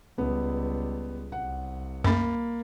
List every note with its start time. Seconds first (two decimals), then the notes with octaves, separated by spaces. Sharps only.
0.18 C#2 G3 B3
1.32 C2 F#5
2.04 F#2 A#3 B5 A6